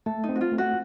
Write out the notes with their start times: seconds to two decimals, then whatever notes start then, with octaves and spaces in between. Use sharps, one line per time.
0.06 A3 A4
0.24 D#4
0.29 C4
0.36 F#4
0.41 F4
0.52 A3
0.58 F#4